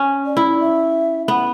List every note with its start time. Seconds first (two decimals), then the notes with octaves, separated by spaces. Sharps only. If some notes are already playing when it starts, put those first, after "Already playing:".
Already playing: C#4
0.26 D5
0.37 E4
0.60 E5
1.28 B3 F#5